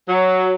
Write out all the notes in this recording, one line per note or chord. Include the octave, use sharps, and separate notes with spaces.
F#3